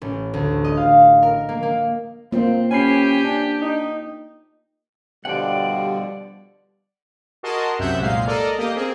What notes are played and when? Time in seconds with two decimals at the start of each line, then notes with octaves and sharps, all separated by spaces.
0.02 A1
0.34 D2
0.64 D#5
0.77 F5
1.23 A#4
1.49 A#3
1.63 A#3
2.32 A#3 C4 F4 C5
2.71 C#4 G4 G#5 B5 C7
3.24 D4
3.62 D#4
5.25 B2 D3 F3 G3 D5 F#5 G5
7.43 F#4 G#4 A#4 D#5 A5 C6
7.79 C2 F#2 C3 E5 F#5 G6
7.98 C2 A#2 G#3 F5 C7
8.27 A4 A#4 D5 D#5
8.58 A#3 G4 D#5
8.75 A#3 C4 G#4